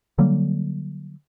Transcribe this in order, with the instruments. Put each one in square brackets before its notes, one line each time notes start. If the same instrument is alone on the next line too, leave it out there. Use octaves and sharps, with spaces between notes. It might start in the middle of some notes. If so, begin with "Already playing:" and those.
[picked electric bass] D3 F#3 G3 A#3